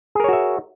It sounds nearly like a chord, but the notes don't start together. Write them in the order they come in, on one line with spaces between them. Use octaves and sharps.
G#4 A#4 C#5 F#4 E5